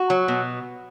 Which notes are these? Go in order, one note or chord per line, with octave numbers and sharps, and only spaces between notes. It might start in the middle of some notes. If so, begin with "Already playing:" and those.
Already playing: F#4
F#3
B2